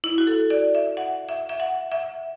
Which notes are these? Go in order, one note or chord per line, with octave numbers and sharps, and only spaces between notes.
E4
F#4
A4
D5
E5
F#5
E5
E5
F#5
E5